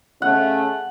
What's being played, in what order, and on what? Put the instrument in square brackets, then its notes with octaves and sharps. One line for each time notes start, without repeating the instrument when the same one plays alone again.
[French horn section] C#3 A3 C#4 [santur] F#5